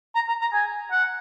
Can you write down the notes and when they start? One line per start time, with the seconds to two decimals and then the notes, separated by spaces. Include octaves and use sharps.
0.15 A#5
0.28 A#5
0.41 A#5
0.53 G#5
0.91 F#5